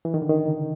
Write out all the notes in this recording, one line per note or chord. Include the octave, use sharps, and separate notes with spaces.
E3
D#3
D3
D#3
C#3